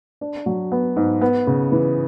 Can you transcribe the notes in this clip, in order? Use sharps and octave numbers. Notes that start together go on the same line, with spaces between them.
D4
F#3
B3
G#2
B3
C#3
E3